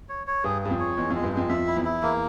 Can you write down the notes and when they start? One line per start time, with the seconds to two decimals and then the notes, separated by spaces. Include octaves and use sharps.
0.09 C#5
0.27 C#5
0.44 G2 G#4
0.62 G2 G#4
0.71 F2
0.80 C#5
0.97 E2 G#3
1.10 F2 G#3
1.23 G2
1.32 F2 G#3
1.49 F2 E5
1.67 E4
1.76 E2
1.85 E4
2.02 E2 A#3